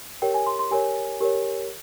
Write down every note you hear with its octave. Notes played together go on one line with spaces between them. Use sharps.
G4 A#4 C#5 G5
G#5
C6
C6
G4 A#4 C#5 G#5
G4 A#4 C#5